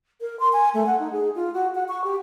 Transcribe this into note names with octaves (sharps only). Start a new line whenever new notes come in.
A#4
C6
G#5
A3
F#5
D#4
G#4
F4
F#4
F#5
C#6
G4